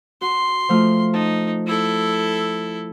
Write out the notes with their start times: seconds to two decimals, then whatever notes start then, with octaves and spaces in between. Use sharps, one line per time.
0.21 F#4 C6
0.69 F3 A3 F4
1.14 D#4 A5
1.67 E4 A4